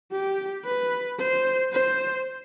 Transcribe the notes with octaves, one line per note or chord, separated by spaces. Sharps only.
G4
B4
C5
C5